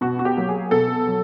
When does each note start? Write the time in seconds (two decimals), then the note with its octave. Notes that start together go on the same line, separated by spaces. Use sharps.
0.01 B2 F#4
0.19 F#4
0.25 G4
0.37 F#3 A#3
0.49 G#4
0.71 B2 A4
1.07 F#3